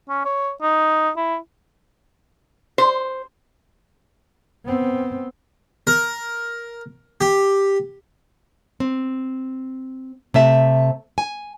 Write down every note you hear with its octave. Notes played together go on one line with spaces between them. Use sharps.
C#4
C#5
D#4
E4
C5
B3 C4
A#4
G4
C4
C3 A3 E5
G#5